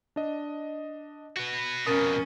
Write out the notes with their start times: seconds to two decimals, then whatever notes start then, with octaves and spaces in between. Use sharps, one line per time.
0.16 D4 D#5
1.36 F#4 B4
1.86 F2 B2 C#4 A#4 D#6 A6 D#7